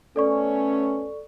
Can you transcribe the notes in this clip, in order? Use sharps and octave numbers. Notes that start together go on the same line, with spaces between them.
A3 B3 C#4 A4 D5 C#6